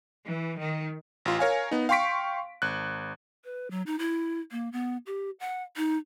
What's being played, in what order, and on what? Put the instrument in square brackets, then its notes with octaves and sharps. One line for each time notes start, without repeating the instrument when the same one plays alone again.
[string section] E3
D#3
[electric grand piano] A1 F4
A#4 C#5 F5 G#5
B3 D#4
F5 G5 C6 C#6 B6 D7
G#1 F#6
[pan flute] B4
F#3
D#4
E4
A#3
B3
G4
F#5
D#4